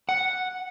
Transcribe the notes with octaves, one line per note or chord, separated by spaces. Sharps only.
F#5